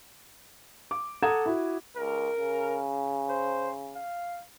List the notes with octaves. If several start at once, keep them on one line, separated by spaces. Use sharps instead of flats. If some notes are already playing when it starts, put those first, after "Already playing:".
D6
A4 F#5 A#5 D#6 G#6 E7
E4 F#4
C#2 A#4
C#3
C5
F5